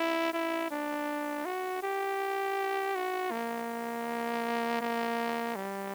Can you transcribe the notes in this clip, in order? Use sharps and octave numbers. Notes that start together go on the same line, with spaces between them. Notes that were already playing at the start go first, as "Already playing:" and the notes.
Already playing: E4
E4
D4
F#4
G4
F#4
A#3
A#3
G3